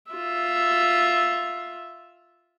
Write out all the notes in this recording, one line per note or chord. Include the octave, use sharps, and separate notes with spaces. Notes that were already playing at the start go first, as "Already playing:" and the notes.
F4 E5